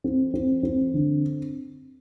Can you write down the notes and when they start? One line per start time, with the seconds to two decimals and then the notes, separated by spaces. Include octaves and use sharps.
0.04 C4
0.34 C4
0.63 C4
0.94 D3